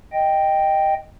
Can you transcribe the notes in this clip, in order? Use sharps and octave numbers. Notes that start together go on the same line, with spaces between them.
D#5 G5